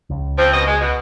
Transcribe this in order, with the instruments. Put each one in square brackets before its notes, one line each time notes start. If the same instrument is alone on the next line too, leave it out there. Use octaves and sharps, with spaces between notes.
[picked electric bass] C#2
[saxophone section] F3 C4
B2 D#5
G#3
B2